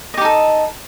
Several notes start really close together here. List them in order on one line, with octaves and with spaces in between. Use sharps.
D#5 G4 D#4 A4